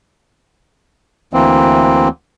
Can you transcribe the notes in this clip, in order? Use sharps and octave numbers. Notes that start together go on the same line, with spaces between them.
D2 E3 A#3 C4